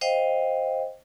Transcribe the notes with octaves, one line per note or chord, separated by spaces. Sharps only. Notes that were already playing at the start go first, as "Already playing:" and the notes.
C5 D#5 F5 G5